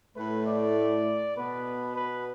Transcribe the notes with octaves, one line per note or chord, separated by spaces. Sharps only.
A2 A3 B4
D5
B2 B3 B4
B4